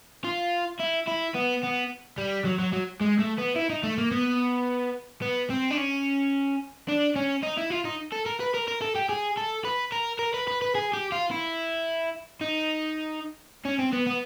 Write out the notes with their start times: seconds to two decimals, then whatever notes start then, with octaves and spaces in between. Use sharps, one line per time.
0.25 F4
0.79 E4
1.07 E4
1.34 B3
1.63 B3
2.18 G3
2.45 F#3
2.59 F#3
2.73 F#3
3.01 G#3
3.19 A3
3.38 B3
3.56 E4
3.70 D#4
3.83 A3
3.98 A#3
4.11 B3
5.22 B3
5.50 C4
5.71 D4
5.77 C#4
6.88 D4
7.16 C#4
7.43 D#4
7.58 E4
7.71 F4
7.85 D#4
8.12 A4
8.26 A#4
8.40 B4
8.54 A#4
8.68 A#4
8.82 A4
8.96 G4
9.09 G#4
9.37 A4
9.65 B4
9.92 A#4
10.19 A#4
10.34 B4
10.48 B4
10.62 B4
10.75 G#4
10.93 G4
11.12 F4
11.31 E4
12.41 D#4
13.65 C#4
13.79 C4
13.93 B3
14.07 B3